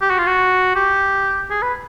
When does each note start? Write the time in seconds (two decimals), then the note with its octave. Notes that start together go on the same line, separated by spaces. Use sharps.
0.01 G4
0.10 F#4
0.18 F4
0.26 F#4
0.75 G4
1.50 G#4
1.62 B4